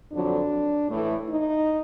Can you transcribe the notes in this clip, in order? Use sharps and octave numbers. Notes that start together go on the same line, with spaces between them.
F2 D3 F#3 D4
A2 E3 A3
D#4